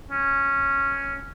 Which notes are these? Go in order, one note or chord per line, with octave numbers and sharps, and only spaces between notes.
C#4